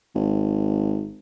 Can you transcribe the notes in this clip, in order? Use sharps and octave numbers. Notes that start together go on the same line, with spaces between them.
G#1